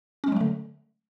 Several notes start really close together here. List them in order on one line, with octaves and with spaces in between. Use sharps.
C#4 G#3 F#3 A3 D3